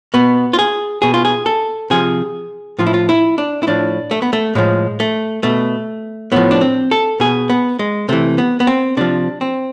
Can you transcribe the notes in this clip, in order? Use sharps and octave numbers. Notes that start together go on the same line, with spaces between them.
B2 B3
F4
G#4
B2 G#4
F4
G#4
A4
C3 F3 G#4
A2 F3 F4
E4
F4
E4
D4
E4
A2 F3 D4
A3
B3
A3
A2 F3 G#3
A3
B2 A3
A2 F3 B3
D4
C4
A4
B2 G#4
B3
G#3
C3 E3 A3
B3
B3
C4
C3 F3 D4
C4